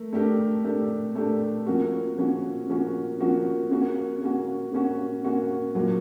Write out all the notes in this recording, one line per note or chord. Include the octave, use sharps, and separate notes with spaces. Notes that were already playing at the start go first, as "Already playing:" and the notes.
Already playing: A3 A#4
A3 D4 G4 A#4
A3 D4 G4 A#4
A3 D4 G4 A#4
F3 A#3 C#4 F#4 A#4
F3 A#3 C#4 F#4 A#4
F3 A#3 C#4 F#4 A#4
F3 A#3 C#4 F#4 A#4
A#3 C#4 F#4
A#3 C#4 F#4
A#3 C#4 F#4
A#3 C#4 F#4
A#2 F#3 A#3